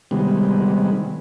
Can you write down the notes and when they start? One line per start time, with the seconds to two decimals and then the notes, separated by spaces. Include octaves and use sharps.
0.11 C3 D#3 G3 G#3 B3